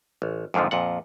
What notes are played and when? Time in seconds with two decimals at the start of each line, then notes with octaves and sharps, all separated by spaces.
0.22 A1
0.54 F2 G#2 D3 D#3 F3
0.71 F2 A#2 F#5